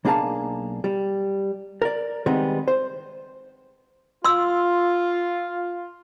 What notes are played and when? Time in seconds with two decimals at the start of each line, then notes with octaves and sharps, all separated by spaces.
0.05 B1 A#3 D4 G#4 F5 A5
0.84 G3
1.82 A#4 D5
2.26 D#3 G3 G#3 B3 C4
2.68 C5
4.24 F4 C6 E6